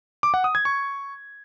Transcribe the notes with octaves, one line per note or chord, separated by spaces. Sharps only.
D6
F#5
D#6
G#6
C#6